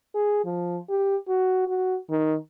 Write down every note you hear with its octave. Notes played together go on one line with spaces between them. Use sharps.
G#4
F3
G4
F#4
F#4
D#3